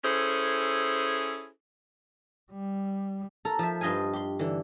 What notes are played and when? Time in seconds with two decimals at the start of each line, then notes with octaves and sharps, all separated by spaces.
0.04 C#4 E4 G#4 A4 C5
2.51 G3
3.45 A4 A#4 A#5
3.59 F3 E5
3.81 G2 F4 D#5 F5 G#5
4.13 G4 C6
4.39 D3 E3